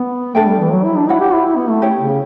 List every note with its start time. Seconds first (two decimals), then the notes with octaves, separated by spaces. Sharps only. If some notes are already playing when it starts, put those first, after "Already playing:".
Already playing: B3
0.35 A3 D4 A4 E5 G5
0.47 G3
0.60 E3
0.72 F#3
0.84 E4
0.96 D4
1.08 E4 F#4 C#5 F#5
1.20 G4
1.33 E4
1.45 E4
1.57 B3
1.70 A3
1.82 C#4 E4 G4 C#5
2.01 C#3